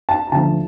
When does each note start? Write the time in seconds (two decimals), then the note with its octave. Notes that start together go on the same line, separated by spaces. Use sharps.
0.09 A5
0.27 A#5
0.32 D2 D3 F3 A5